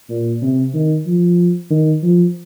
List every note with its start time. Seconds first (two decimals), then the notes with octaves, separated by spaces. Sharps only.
0.10 A#2
0.43 C3
0.74 D#3
1.07 F3
1.71 D#3
2.03 F3